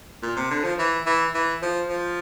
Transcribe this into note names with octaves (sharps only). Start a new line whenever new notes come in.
A#2
C3
D3
F3
E3
E3
E3
F3
F3